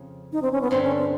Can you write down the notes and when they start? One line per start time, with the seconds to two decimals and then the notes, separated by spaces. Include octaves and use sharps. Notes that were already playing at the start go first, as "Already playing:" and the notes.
Already playing: F2 C#3 F3
0.32 D#4
0.42 C4
0.52 C#4
0.61 B3
0.70 G2 D3 G3 C4
0.83 C#4
0.97 C4